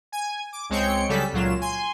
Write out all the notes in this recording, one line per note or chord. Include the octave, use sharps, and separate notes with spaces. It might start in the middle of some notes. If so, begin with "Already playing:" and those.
G#5
D6
C#2 G#3 C4 C#5 G5 C#7
C#3 F#3 G3 A4 B6
C#2 A#2 F#3 F4 E7
G#5 C6